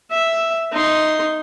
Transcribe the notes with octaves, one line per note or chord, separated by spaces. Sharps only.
E5
D#4 C6